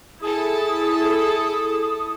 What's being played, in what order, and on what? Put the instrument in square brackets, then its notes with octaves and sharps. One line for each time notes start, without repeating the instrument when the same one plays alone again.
[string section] E4 A4 A5 [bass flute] G#4 [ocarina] D#6